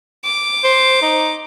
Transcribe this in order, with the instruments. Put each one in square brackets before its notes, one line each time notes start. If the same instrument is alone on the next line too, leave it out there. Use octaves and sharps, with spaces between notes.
[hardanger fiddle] D6
[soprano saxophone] C5
D#4